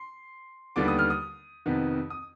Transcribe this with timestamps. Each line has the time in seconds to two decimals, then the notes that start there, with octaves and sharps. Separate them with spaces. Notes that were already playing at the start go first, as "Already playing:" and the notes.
Already playing: C6
0.76 D#2 D3 G3 B3 D6
0.88 D#6
0.99 F6
1.10 D#6
1.66 F2 C3 D#3 B3
2.10 D#6